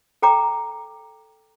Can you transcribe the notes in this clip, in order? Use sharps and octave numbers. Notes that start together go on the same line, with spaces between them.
A4 G5 A#5 D6